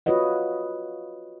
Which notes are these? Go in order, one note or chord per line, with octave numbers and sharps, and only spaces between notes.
F4 F#4 B4 C#5 D#5 F#5